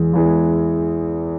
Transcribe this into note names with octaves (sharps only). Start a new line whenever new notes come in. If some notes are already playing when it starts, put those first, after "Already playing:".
Already playing: E2 E3 G#3
E2 E3 G#3